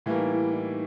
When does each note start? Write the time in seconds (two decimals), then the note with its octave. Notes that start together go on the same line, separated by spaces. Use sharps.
0.06 A2 E3 G3 A#3 E4
0.19 D#4
0.33 E4
0.52 D#4